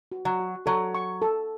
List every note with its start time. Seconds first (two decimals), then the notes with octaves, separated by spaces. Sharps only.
0.12 F#4
0.25 F#3
0.39 F#4
0.66 F#3 A4
0.95 C#6
1.22 A4